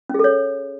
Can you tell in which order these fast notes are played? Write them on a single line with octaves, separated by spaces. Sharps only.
C#4 G#4 A4 C#5